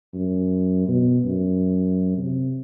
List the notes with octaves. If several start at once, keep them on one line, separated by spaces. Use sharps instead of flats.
F#2
B2
F#2
C3